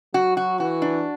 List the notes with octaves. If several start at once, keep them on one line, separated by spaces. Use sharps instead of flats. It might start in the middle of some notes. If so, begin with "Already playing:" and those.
F#3 F#4
F#4
E3 F#4
D4